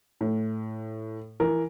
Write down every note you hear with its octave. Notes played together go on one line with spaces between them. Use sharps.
A2
E3 A#4